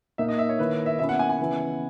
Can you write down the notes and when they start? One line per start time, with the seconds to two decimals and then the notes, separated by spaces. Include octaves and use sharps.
0.18 A#2 A#3 D#4 E5
0.29 D#5
0.38 E5
0.49 C#5
0.59 D#3 A#3 E4 B4
0.86 E5
0.99 B2 A#3 C#4 E4 E5
1.09 F#5
1.19 G#5
1.30 G#5
1.39 C#3 E3 B3 E4